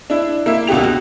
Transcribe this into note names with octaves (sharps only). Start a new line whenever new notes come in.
D4 E4
A#3 E4 E5
C#2 B2 D3 G4 F7
F#4